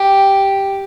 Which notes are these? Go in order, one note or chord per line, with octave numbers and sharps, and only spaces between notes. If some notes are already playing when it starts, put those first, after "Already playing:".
Already playing: G4